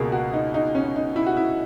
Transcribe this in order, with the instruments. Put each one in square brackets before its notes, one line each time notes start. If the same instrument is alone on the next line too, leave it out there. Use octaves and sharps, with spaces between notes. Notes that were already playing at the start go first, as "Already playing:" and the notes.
Already playing: [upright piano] C#2 B2 A#3 G#4 A#4
F#4
D#4
D#4
C#4
D#4
E4
F#4
E4